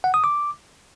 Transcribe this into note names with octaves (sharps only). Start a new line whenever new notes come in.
F#5
D#6
D6